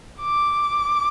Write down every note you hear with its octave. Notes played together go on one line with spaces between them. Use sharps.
D6